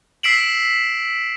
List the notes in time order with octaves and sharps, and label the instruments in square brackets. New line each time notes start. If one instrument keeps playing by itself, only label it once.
[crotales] E6 B6 C7 D7 E7 F#7